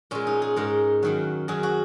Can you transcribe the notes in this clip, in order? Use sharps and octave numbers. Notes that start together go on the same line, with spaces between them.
A#2 G#3 C#4
D#4
G#4
G#2 G#3 A#4
F#2 D#3 F#3
F#2 F#3 G#4
F#4